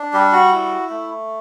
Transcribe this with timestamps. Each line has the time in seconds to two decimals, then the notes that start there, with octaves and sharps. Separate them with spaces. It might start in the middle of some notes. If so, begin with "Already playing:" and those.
Already playing: D4
0.13 G3 G4
0.33 F#4
0.52 E4
0.90 A3